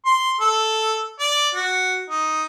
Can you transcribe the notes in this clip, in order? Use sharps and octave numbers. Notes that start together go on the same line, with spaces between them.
C6
A4
D5
F#4
D#4